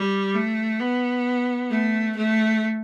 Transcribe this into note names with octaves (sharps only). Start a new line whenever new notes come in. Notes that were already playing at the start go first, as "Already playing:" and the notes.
Already playing: G3
A3
B3
A3
A3